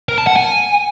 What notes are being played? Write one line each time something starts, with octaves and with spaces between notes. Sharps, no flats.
A#4
A5
F#5
G#5